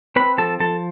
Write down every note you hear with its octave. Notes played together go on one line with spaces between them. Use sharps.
C4 B4 B5
F3 A4 A5
F3 A4 A5